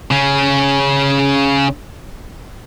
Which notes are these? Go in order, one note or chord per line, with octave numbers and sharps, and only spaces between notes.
C#3 C#4